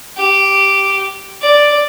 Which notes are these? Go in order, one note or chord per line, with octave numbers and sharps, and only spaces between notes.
G4
D5